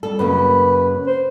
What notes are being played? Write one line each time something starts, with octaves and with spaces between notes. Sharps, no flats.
G3 A4
F#2 C#3 A#3 B4
C5